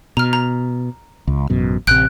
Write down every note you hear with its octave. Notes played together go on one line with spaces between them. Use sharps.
B2 A#5 F6
A#5
C#2
A1 F#2 B2
A1 C3 F#6 G6 D7